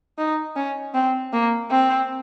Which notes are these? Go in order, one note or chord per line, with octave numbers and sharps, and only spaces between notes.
D#4
C#4
C4
A#3
C4